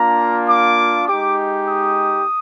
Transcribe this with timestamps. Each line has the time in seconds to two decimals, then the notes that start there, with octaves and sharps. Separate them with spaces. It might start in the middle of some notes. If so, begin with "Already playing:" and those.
Already playing: A#3 D4 F4 A#5
0.49 D6
1.08 G#3 D#4 G4 D6
1.68 D#6